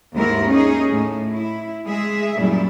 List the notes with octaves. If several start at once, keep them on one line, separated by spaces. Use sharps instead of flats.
D#2 G#2 E4 A#4
C#4 D#4 G#4
A2
E4
G#3 G#4 E5
F#2 A#2 G3 E4